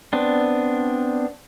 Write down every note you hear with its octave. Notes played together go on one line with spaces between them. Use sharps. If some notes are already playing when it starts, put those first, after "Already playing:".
B3 C4 D4